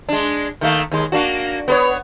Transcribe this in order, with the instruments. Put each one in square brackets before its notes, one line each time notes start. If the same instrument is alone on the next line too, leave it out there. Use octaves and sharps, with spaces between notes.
[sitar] G#3 D4
D#3 A3 A#3
D#2 G#3
A#3 D4 F#4
B3 A#4 C#5